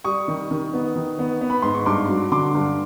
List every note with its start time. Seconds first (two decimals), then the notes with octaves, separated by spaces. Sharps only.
0.04 G3 C#6 D#6
0.28 D#3
0.51 D#3
0.74 B3
0.96 D#3
1.19 B3
1.41 B3
1.50 B5
1.62 G#2 C6
1.75 C#6
1.86 G2 C6 D6
2.09 F#3
2.32 D3 C6 D6
2.55 G2